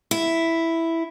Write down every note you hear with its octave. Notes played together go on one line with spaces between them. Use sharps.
E4